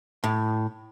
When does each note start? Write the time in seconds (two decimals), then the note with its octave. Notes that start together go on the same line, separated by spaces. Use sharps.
0.24 A2